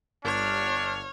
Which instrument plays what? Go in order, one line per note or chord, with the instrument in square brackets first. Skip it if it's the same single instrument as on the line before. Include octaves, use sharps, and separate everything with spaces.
[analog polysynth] G1 F6 [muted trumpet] D4 [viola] C#5